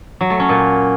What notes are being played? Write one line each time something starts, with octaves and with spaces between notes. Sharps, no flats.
F#3
A3
C#4
A#2